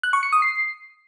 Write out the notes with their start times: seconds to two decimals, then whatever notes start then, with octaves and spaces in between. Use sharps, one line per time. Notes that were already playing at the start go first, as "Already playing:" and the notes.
0.03 F#6
0.13 C#6
0.23 C#7
0.32 D#6
0.42 C7